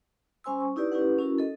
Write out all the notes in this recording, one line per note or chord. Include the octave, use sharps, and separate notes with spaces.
G3 C#4 C5 G#5 C6 E6
C#6
D#4 E4 G4 B4 D5
C#4 E4 G4 B4 F#5
C#4 E4 F#4 A#4
A4 D#5